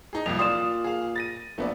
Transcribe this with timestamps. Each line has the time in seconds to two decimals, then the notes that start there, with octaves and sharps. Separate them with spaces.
0.13 D#4 G#4
0.26 C2 F2 A#2 F7
0.39 A#2 F4 D5 C6 D#6 E7
0.84 G#4 F5
1.16 A6 A#6 D#7
1.58 A#1 A3 B3 D5